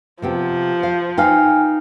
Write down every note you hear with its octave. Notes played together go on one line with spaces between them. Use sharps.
C3 F3 B3 G4
F5
D#4 B4 F5 G5 G#5 F6